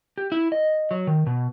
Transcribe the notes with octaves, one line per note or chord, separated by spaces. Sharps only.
G4
E4
D#5
F#3
D#3
B2